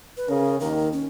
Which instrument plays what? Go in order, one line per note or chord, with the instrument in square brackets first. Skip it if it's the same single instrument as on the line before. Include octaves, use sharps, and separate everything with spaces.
[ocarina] B4
[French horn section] C#3 [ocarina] A#4
[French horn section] D#2 D#3 [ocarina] A#4
[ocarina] C#4